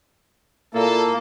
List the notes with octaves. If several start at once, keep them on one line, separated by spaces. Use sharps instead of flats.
A#2 A#3 E4 A4